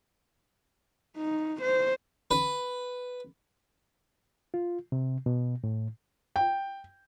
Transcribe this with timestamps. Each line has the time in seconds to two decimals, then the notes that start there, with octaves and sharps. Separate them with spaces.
1.17 D#4
1.62 C5
2.31 B4
4.54 F4
4.92 C3
5.26 B2
5.64 A2
6.36 G5